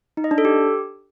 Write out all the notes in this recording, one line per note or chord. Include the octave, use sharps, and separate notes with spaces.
D#4
D#5
D4
A4
G4